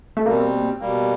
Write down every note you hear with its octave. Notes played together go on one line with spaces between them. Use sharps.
A3
B2 G3 A#3 C4
B2 G3 A#3